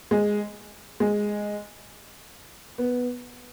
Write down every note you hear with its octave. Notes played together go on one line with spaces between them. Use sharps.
G#3
G#3
B3